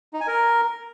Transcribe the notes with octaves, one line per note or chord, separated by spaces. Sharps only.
D#4
G#5
A#4